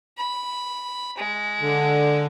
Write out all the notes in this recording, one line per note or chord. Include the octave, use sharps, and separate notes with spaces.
B5
G#3
D3